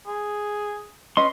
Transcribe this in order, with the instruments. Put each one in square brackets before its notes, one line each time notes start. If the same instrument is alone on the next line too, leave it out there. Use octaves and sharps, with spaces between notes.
[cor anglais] G#4
[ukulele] C#4 B4 D#5 [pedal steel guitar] C6